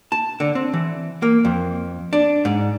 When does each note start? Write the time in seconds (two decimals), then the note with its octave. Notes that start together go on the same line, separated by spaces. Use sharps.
0.12 A5
0.40 D3
0.55 C4
0.73 E3
1.22 A#3
1.45 F2
2.13 D4
2.45 G#2